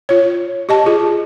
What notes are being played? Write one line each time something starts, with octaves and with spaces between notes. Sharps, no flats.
F4 C#5
G4 D#5 A5
F4 G#4